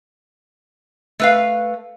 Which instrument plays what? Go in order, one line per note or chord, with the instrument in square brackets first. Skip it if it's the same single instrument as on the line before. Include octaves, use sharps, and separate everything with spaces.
[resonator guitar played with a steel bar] A3 B4 F5